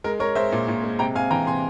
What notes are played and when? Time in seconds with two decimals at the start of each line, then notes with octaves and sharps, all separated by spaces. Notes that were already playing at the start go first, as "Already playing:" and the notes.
0.04 G#3 A#4
0.19 G#3 A#4 C#5
0.35 G#3 C5 E5
0.52 A#2
0.68 A#2
0.84 G#3
0.99 C3 G5 A#5
1.15 C3 F5 G#5
1.31 E3 G5 A#5
1.47 C3 G#5 C6